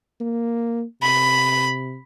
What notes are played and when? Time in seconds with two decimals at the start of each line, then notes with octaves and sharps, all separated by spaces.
0.21 A#3
1.02 C3 B5